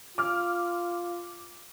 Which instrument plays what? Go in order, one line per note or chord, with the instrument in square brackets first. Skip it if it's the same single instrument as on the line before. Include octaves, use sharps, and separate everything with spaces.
[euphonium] F4 [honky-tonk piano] D6 F6